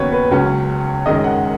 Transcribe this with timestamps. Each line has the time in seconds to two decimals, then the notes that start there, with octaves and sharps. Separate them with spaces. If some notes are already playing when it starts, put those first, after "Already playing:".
Already playing: D#2 C#3 F#3 B3 B4 C#5
0.13 B4
0.31 C#2 C#3 F#3 C#4
1.06 F#2 D#3 G#3 C#4 D#5
1.24 F#5